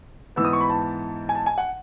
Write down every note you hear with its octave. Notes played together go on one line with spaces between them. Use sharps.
G#2 E3 B3 E6
D#6
C#6
B5
A5
G#5
A5
G#5
F#5